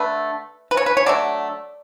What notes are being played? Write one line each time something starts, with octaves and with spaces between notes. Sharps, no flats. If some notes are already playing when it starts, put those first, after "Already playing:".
Already playing: D3 A3 B4
B4
C#5
B4
C#5
D3 F#3 A3 D5